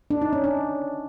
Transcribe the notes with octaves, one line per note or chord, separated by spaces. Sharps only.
D4
D#4
C#4
D4